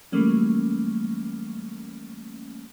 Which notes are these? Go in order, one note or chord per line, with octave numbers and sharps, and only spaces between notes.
E3 F#3 G3 A3 A#3 C#4